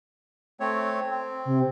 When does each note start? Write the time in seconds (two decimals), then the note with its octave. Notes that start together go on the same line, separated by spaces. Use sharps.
0.60 A3 C4 C#5
1.10 C4
1.45 C3